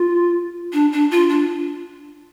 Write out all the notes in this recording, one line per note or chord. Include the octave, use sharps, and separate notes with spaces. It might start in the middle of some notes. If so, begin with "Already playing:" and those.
Already playing: F4
D4
D4
F4
D4